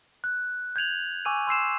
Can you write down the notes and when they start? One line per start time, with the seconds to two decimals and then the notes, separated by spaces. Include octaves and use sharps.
0.24 F#6
0.76 G6 G#6 F7 F#7
1.25 G#5 C#6 D6 E6 D#7
1.47 C6 E6 C7 E7